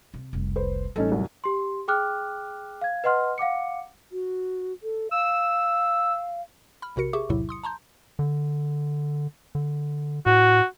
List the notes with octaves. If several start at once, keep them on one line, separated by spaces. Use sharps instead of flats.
C3
F1 C2
B4 C5
A1 G3 C#4 D#4 A4
C2 F#2
G4 C6
G#4 G5 D6 F6 F#6
F5 G#6
B4 D#5 F#5 C6 F6
F5 F#5 D6 C#7
F#4
A4
F5 E6
B5 F6
A#1 C3 F#4 A#4 C#7
G4 G#4 E5 C#6 D6
B1 E2 A2 C3 F#3 E4
C6 D#6 C#7
A5 A#5 C6 G6
D3
D3
A2 F#4